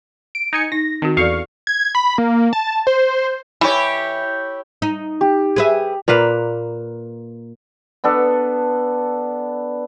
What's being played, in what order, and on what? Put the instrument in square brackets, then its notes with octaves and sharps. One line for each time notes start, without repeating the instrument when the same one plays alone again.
[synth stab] D7
D#4 G#5 C#7
[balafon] D#4 [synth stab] A#6
[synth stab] D#3 [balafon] C4 F#4
[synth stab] E2 F5 C#6 [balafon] F#4 A4 D5
[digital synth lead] G#6
B5
A#3
A5
C5
[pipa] E3 [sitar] E4 G4 C#5
[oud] D#4
[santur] G4
[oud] G#4 B4 E5
[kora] A#2 A#3 B4 F5
[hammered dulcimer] B3 D4 A4